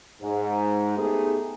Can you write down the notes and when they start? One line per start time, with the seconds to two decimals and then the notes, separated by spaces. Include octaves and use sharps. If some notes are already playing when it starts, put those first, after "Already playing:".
0.22 G#2
0.97 A3 B3 D#4 G4 G#4